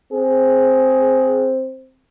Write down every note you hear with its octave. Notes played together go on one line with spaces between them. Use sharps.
C4 G#4